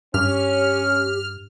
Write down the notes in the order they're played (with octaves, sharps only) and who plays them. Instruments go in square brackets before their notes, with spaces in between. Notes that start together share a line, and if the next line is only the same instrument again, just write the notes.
[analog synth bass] G2 [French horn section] C#4 [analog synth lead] G4 [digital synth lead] F6